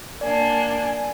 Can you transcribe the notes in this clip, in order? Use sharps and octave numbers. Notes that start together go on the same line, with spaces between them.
A#3 D4 D5 G#5